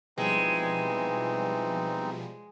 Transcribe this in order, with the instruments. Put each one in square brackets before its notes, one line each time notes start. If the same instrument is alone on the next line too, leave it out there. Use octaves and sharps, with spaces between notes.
[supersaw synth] B2 F3 G3 [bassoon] E3 [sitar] G#3 [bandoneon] C4 D#4